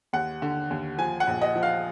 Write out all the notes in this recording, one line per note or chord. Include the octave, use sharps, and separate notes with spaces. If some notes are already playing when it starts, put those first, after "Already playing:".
D#2 F#5
D3
D#2
F3 G#5
F#5
A#1
D#5
F3
F5